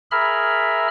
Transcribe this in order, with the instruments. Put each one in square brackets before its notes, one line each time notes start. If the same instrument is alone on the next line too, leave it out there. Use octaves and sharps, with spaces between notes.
[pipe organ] G#4 A#4 E5 B5 F6